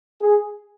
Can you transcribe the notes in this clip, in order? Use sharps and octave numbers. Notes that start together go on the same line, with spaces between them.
G#4